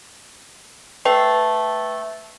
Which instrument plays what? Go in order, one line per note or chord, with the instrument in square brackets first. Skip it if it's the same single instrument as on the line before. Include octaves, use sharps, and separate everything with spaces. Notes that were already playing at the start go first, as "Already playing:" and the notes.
[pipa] A3 [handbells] B4 G5